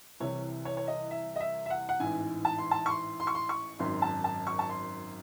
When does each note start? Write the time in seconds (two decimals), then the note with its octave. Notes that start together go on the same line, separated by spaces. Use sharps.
0.20 C2 C3 E3 C#5
0.65 C#5
0.77 C#5
0.88 D#5
1.11 E5
1.36 D#5
1.40 E5
1.66 E5
1.70 F#5
1.89 F#5
2.00 A1 G#2 E3 G#5
2.45 A5
2.58 C6
2.71 A5
2.86 C#6
2.90 C6
3.20 C6
3.27 C#6
3.35 C6
3.49 C#6
3.79 G#1 F#2 D#3 C6
4.02 A5
4.24 A5
4.47 C#6
4.59 A5
4.69 C6